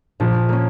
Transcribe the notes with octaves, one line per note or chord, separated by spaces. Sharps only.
A#2 F3
A#3 C#4